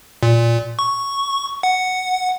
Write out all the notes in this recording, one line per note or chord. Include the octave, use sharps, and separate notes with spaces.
A#2
C#6
F#5